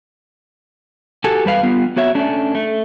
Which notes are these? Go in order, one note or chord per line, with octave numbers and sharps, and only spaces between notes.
F#4 G4 A4 G#5
E2 G3 B4 F5
G3 B3 F4
B3 F#4 C#5 E5
A3 C#4 D4
A3